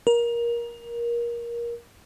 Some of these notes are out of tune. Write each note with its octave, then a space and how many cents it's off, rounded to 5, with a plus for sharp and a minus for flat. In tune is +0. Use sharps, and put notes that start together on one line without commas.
A#4 +20